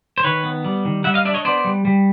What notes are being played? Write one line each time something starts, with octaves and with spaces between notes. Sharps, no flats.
C5
D#3 B4 C#5
B3
G3
D#3
G3 E5 F#5
D#5 F5
D4 D5 E5
C#5 D#5
B3 C5 D5
G3
G3